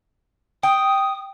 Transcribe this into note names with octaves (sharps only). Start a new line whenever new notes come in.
G5 D#6